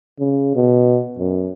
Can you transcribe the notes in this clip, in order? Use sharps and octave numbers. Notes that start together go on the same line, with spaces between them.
C#3
B2
F#2